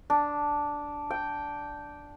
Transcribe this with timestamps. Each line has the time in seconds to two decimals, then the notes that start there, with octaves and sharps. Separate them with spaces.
0.10 D4
1.10 G5